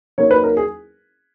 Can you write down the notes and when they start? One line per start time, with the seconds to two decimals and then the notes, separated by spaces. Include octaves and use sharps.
0.18 F#3 A#3 D#4 C#5
0.31 B4
0.44 A#4
0.57 G#4